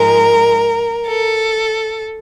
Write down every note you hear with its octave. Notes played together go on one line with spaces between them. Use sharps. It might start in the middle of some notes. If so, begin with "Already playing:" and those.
Already playing: G#2 F3 G#3 A#4
A4